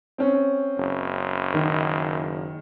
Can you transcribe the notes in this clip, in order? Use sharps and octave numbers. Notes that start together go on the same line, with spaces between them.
C4 C#4
F#1
D#3